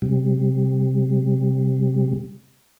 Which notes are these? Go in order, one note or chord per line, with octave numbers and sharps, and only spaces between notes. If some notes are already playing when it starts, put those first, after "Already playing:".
C3 G3